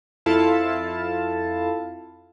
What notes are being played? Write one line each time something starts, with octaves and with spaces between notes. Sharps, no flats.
F2 E4 F4 A4 F5 A5